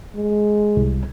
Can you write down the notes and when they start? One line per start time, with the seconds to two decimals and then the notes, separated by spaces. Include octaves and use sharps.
0.16 G#3
0.77 C2